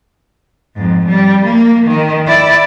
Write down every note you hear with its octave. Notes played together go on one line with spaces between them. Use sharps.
F2 G#2
G3
A#3
D#3
E4 D5